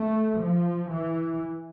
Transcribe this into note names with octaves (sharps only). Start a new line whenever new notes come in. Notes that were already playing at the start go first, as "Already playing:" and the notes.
Already playing: A3
F3
E3